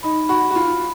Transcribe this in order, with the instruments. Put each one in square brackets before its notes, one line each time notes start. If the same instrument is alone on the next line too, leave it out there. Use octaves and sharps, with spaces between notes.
[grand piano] D#4 [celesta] B5
[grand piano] F#4 [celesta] B5
[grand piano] F#4
[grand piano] F4 [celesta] B5